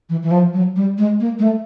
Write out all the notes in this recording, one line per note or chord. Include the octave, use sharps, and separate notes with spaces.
E3
E3
F3
F#3
G3
G#3
A#3
G#3
A3